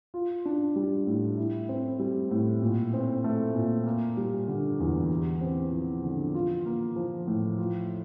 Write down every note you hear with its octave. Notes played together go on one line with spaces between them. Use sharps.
F4
D4
G3
A2
E4
C4
G3
A2
A#2
C4
A3
A#2
A#3
G3
D3
E2
G4
C4
F3
D3
F4
A#3
F3
A2
F4